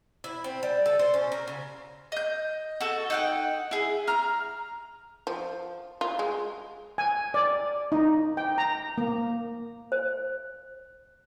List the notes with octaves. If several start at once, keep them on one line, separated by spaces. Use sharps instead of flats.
E4
C4
G3
A4
C5
C#4
A#4
C#3
D#5 G6
F#4 A4
D#4 F#5 G5
E4 G#4
A#5 F6
F3
F4
G#3
G#5
D5
D#4
G5
A#5
A#3
C5